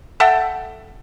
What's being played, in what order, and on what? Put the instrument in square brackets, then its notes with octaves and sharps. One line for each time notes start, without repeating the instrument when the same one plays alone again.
[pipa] A4 E5 F#5 G5